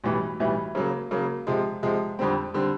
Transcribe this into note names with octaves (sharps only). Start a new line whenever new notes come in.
B1 A2 E3 G3
B1 A2 E3 G3
C#3 F#3 A#3
C#3 F#3 A#3
C3 F3 G#3
C3 F3 G#3
F2 D3 G3 C4
D3 G3 C4